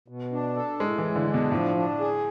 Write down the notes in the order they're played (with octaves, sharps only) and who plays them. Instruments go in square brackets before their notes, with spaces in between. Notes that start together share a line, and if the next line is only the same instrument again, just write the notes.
[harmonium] B2
D4
A4
[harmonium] A2 [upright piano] G#3
[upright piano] E3
[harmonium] G#3
[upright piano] D3
[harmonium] D4
[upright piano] B2
[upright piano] A2 [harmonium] F3
[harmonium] D4
G#4